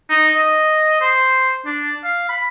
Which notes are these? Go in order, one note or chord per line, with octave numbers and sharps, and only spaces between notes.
D#4
D#5
C5
D4
F5
B5